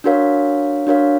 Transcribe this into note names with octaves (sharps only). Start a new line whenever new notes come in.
D4 F#4 A#4 C#5 F5
D4 F#4 A#4 C#5 F5